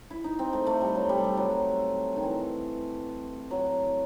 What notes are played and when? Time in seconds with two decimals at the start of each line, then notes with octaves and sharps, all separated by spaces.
0.10 E4
0.24 D#4
0.39 C4
0.53 A3
0.67 A3
0.81 G3
0.95 F#3
1.09 G3
1.24 G3
1.37 F#3
2.16 D#3
2.23 E3
3.51 F#3